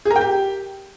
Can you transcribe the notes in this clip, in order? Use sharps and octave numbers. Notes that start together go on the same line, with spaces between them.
G#4
A#4
G5
G4